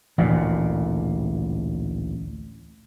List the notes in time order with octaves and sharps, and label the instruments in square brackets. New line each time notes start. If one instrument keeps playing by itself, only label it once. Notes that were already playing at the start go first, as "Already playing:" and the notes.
[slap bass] A1 D2 A#2